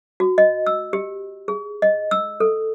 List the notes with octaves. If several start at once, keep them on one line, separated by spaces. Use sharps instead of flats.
F#4
D#5
E6
G4
G#4
D#5
E6
A4